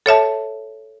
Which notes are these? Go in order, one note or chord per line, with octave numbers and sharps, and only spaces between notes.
A4 C#5 E5 A5